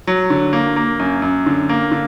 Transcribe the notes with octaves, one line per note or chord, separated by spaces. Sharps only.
F#3
D3
A#3
A#3
F#2
F#2
D3
A#3
D3